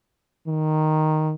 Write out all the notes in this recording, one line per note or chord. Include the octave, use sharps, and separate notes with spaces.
D#3